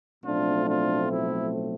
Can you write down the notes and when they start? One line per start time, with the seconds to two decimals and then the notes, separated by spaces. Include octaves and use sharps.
0.24 B1 A2 F3 A3 C4 D4 F4
0.66 D4 F4
1.09 E4